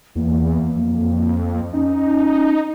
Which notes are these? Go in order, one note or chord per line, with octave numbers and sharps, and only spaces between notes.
E2 A#3
F2
C#4 D#4